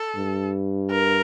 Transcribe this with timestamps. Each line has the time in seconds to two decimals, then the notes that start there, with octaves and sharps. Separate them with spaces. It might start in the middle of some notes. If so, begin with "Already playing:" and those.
Already playing: A4
0.17 G2
0.91 A#4